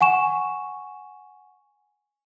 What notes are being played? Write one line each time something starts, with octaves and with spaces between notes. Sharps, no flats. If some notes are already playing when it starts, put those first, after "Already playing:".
F#5 G#5 C#6 E7